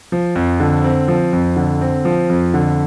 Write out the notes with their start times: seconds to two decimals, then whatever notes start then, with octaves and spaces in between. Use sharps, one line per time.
0.12 F3
0.36 F2
0.60 D3
0.84 C4
1.08 F3
1.33 F2
1.56 D3
1.81 C4
2.05 F3
2.30 F2
2.54 D3